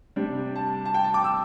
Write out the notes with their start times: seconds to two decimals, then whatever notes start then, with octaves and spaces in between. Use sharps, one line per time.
0.16 C3 G3 D4
0.56 A5
0.86 A5
0.94 G5
1.05 A5
1.14 D6
1.24 E6